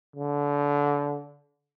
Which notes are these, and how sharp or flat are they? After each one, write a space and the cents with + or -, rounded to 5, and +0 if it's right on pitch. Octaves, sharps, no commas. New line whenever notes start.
D3 -25